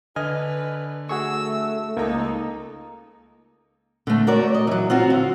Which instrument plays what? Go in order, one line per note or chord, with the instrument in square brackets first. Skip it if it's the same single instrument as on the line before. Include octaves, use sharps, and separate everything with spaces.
[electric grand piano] D3 F6 [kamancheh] B4 [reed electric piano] D#5 G#5
[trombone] A3 [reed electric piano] F#4 G#4 C#6 [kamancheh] E6
[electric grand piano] C#2 A#5 [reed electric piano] A#3 [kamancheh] D#4 A4
[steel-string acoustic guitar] D3 A3
F#4 A#4 C#5 D5
D#5
E3 F#3
C4 F4 F#4
D3